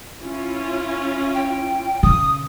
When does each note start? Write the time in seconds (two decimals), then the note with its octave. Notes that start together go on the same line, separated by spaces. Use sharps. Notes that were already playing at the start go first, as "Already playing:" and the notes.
0.22 C#4 E4 F4
1.35 G5
2.03 C#3 D#6